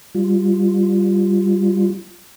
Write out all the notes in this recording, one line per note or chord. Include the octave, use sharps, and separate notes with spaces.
G3 F4